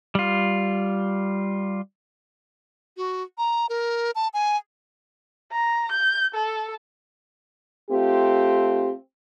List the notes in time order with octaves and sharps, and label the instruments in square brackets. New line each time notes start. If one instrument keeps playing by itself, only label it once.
[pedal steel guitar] G3 F4
[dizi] F#4
A#5
A#4
A5
G#5
[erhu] A#5
G6
A4
[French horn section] A3 C4 F4 G4